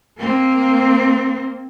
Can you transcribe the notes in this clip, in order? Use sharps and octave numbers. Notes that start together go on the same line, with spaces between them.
A#3 C4